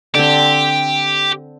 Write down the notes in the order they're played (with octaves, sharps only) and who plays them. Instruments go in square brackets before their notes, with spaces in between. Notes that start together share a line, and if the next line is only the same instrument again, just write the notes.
[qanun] D3 C4 [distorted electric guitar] G4